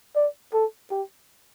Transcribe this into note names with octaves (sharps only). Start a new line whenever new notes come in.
D5
A4
G4